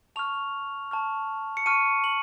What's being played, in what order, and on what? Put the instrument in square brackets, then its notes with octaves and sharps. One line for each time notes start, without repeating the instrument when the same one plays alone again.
[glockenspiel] A5 C#6 F6 F7
A5 C#6 F6
C#7
A5 C#6 F6 D#7
F#7